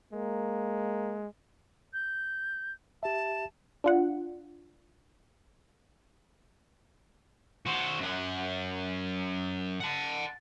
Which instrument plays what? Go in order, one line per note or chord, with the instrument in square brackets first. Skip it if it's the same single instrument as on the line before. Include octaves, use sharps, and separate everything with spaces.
[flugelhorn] G#3 [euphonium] A#3
[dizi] G6
[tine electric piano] G4 E5 [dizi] A5
[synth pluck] D4 F4 F#5
[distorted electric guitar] F#4 C5
F#2 F#5
F#5 A5